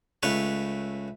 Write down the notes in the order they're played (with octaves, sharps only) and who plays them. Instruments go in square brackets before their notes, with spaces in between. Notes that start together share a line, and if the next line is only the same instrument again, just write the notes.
[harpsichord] C#2 A3 B4 C#5